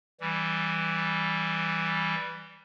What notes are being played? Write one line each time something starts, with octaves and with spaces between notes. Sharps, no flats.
E3 G3